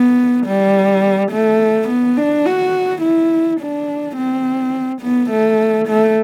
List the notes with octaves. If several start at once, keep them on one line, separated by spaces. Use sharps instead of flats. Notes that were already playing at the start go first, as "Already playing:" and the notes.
Already playing: B3
G3
A3
B3
D4
F#4
E4
D4
C4
B3
A3
A3